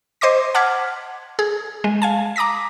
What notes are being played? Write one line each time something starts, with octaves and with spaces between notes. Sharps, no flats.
C5 D#5 C6 D6 A#6
F#5 A5 D6 F6 G#6 B6
G#4
G#3
F5 G#5 A5
A#5 D6 D#6 A#6 B6